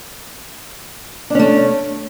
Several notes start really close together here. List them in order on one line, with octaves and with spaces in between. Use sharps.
D4 C#4 A3